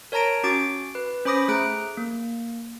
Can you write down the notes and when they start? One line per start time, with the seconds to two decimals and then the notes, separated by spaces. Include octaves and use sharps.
0.12 A#4 C#5 A5 A#5 A#6 D7
0.43 C#4 F#4 D6 A6 D7
0.95 B4
1.25 C#4 C5 B5 D6 D#6 A#6
1.48 A3 G#4 A#5 F#6 D7
1.97 A#3